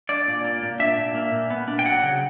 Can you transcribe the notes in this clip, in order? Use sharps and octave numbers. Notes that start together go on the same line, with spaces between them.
D4 D5
A#2
A#3
A#2
D4 E5
A#2
A#3
A#2
B3
D4
G5
F#3 F#5
C#3